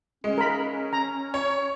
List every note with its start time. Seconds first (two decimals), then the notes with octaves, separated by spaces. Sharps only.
0.24 G#3 C#4
0.38 A#4 B5
0.93 A#5
1.34 C#5